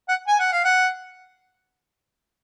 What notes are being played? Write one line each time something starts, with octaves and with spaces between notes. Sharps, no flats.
F#5
G#5
F#5
F5
F#5